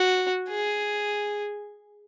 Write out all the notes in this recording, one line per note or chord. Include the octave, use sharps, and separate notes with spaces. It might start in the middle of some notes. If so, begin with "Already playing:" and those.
Already playing: F#4
G#4